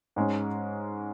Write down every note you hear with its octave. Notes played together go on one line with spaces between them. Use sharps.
G#2 G#3 C#4